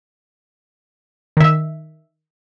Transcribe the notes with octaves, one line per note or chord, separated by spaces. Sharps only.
D#3 E5